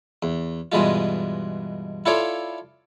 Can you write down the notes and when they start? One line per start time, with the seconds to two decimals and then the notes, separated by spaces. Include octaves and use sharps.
0.23 E2
0.72 G2 B2 E3 G#3 F4
2.06 E4 F4 A4 C#5 D5 F5